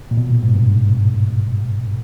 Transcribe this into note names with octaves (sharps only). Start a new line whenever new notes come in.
A#2
B2
A#2
G#2
G2